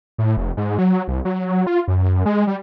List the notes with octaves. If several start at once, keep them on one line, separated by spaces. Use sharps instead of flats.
A2
F1
G#2
F#3
C2
F#3
F4
F#2
G#3
G3